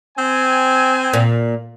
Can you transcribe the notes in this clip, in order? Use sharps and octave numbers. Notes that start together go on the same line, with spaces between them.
C4 G#5
A#2